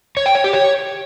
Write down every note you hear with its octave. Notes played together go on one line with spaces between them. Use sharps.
C#5
G5
C#5
G4
C#5